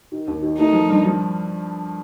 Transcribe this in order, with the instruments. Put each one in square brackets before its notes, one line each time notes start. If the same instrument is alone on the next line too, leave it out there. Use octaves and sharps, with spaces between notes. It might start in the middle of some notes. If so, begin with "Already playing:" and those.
[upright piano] D#3
D#2
D#3
[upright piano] A3 [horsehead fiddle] D#4
[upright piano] F3
G2
F3